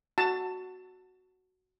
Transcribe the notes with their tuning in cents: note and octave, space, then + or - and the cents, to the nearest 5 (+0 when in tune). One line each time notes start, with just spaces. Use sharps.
F#4 +0 A5 +20